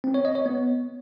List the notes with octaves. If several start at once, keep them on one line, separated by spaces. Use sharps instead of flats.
C4
C#5
D#5
C#5
B3